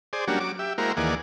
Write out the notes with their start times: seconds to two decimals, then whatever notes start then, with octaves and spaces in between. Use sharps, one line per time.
0.13 G#4 C5 D5
0.28 F#3 G3 A#3 C#4 D4 F#4
0.40 F#3 D6
0.59 G4 E5
0.78 G#3 A#3 E4 F#4 A#4 C5
0.97 D#2 E3 A#3 G#4 D5 F#5